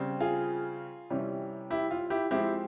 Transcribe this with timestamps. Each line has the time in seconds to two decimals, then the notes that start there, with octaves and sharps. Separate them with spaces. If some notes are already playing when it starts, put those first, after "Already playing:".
Already playing: C#3 G3 C4
0.20 F4 G#4
1.10 C3 E3 G3 C#4
1.70 E4 G4
1.91 F4
2.10 E4 G4
2.31 F3 G#3 C4 E4 G4